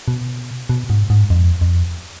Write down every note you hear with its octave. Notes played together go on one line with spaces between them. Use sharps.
B2
B2
G#2
G#2
F2
F2